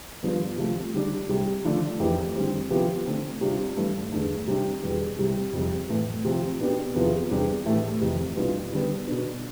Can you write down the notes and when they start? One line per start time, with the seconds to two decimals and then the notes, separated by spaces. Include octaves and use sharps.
0.23 G2 F3 B3 D4
0.58 C3 F3 A3
0.94 D3 G3 D4 G4
1.29 C2 C3 G3
1.64 D3 F3 A3 D4
1.99 F2 E3 A3 E4 G4
2.35 D3 G3 C4
2.70 C3 F3 B3 E4 G4
3.06 D3 A3 C4
3.41 C3 G3 D4 F4
3.77 G2 E3 A3
4.12 E2 D3 A3
4.47 C3 G3 D4 G4
4.83 E2 B2 G3
5.19 C2 C3 G3
5.53 F2 C3 G3
5.89 A2 E3 A3
6.25 C3 F3 C4
6.60 B2 B3 D4 G4
6.95 E2 C3 F3 B3 E4
7.31 E2 C3 G3 D4
7.66 A2 E3 A3 E4 G4
8.01 F2 C3 E3
8.36 C2 B2 B3 D4 F4
8.73 D3 G3 B3
9.07 B2 B3 D4